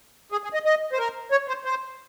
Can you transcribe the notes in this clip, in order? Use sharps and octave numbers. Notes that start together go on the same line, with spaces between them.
G#4
G#4
D#5
D#5
C5
A#4
C#5
C5
C5